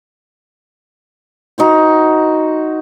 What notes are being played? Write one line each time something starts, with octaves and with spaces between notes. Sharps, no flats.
D#4 F#4 C5